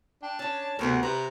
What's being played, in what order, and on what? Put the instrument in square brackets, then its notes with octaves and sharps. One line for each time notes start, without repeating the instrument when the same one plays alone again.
[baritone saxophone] D4 [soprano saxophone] G5
[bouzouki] C#4 C#5 [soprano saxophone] A5
[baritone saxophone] D2 [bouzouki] C3 B3 A#4
[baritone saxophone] C3 [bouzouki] B4 [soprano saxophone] A#5